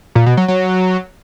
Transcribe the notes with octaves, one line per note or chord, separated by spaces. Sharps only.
A#2
B2
F#3
F#3